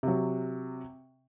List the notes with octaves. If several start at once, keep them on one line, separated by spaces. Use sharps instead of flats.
C3 F#3